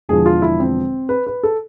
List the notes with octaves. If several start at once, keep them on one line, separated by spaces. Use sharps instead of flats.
E1 E2 D3 F3 G#4
F4
E4
C4
B4
B4
A4